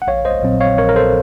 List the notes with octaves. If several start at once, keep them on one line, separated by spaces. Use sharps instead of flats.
F#5
A#1 C#5 F5
C5 D#5
A#2 F#3 C4
C#5 F5
A#1 A#4 C#5
A#4
A4 C5